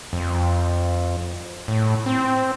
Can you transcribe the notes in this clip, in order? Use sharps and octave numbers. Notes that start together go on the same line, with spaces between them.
F2
A2
C4